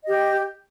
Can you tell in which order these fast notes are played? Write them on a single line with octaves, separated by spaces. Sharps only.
D#5 G4 G5